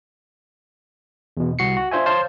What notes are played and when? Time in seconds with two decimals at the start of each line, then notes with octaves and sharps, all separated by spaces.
1.37 E2 B2
1.59 C2 F#4 C7 C#7
1.77 F#4
1.91 D4 F4 C5 E5 G#5
2.06 C5 C#5 F5 A5 C6